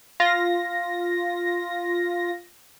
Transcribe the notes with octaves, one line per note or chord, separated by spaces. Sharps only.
F4 A#6